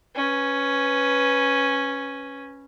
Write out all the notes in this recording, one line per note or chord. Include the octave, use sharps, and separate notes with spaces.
C#4 B4